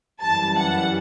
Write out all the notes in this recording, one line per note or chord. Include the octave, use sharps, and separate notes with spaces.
F#2 E3 G3 A5
F#5